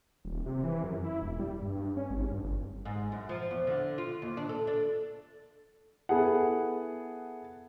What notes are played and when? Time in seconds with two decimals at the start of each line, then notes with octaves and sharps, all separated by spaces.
0.25 D#1
0.46 C3
0.63 E3
0.83 F#2
1.04 E4
1.22 E1
1.39 G3
1.62 G2
1.97 C#4
2.10 G#1
2.31 G2
2.43 G1
2.85 G#2
3.12 F#2
3.29 F3
3.51 E2
3.67 D3
3.98 F4
4.22 D#2
4.37 D4
4.49 A4
4.67 D4
6.09 B3 E4 G#4 A4 F#5